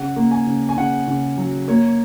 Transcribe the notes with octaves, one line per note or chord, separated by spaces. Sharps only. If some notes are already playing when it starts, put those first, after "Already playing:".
Already playing: C#3 F#5
A#3
G#5
C#3
G#5
C#3 F#5
C#3
F#3
A#3 C#5